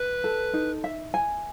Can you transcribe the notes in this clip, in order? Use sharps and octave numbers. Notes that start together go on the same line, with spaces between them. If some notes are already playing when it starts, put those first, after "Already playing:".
Already playing: B4
A4
D#4
E5
G#5